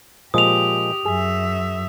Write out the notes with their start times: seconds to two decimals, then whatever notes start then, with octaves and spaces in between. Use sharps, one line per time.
0.34 A#2 F3 G#3 G4 D#6 F7
1.05 F#2 G#4 E5